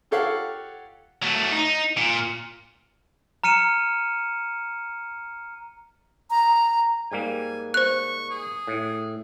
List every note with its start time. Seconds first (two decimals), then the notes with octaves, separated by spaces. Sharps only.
0.11 F4 G4 A4 C#5 F5 F#5
1.22 F#3 A3
1.52 D#4
1.97 A#2
3.44 A#5 F6 C#7 D#7 E7
6.30 A#5
7.12 G#2 G3 A#3 G#5
7.74 C5 C#6 F#6
8.31 G#4
8.67 A2